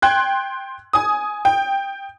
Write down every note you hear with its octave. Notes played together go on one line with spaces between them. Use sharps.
G5 C6 F#6 G#6
G#5 D#6
G5